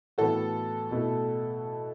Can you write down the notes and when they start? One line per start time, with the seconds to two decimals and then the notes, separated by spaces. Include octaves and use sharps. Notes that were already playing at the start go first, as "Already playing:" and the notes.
0.18 A2 E3 B3 F#4 A4
0.91 B2 A3 E4